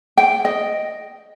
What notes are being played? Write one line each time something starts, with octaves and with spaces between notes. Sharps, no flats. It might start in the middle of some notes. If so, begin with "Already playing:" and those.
G5
D#5